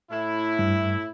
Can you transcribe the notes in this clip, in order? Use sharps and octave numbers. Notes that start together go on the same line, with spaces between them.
A2 E4
G2